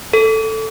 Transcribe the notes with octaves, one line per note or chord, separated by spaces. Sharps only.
A4